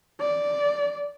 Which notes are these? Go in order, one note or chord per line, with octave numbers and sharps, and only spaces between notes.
D5